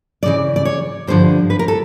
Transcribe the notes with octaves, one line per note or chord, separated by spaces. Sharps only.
D2 C#3 E3 D5
D5
C#5
G2 D3 F3 C5
B4
A#4
A4